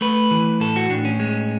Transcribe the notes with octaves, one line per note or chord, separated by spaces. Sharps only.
A3 B4
E3
A2 A4
F#4
A2 D4
C#4
G#3